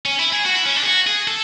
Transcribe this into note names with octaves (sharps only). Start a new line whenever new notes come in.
C#4
E4
G#4
F#4
E4
C#4
D4
G#4
F#4
G#4
A4